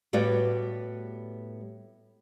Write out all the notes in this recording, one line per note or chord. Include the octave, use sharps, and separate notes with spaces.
A2 G3 B3 F#4 B4 D5